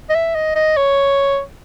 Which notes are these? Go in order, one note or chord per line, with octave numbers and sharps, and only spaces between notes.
D#5
E5
D#5
D#5
C#5